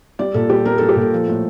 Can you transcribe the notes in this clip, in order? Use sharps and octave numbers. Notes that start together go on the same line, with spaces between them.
G3 D5
A#2 A4
G3 G4
G3 A#4
G3 A4
G4
A#2
A4
F3
A2